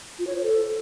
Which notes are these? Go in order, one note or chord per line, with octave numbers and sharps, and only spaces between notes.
F4
C#5
C5
A4